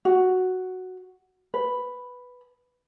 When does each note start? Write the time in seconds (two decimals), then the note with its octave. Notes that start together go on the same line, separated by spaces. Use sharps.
0.05 F#4
1.54 B4